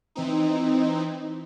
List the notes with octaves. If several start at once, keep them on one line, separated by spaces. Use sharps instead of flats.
E3 C4 D#4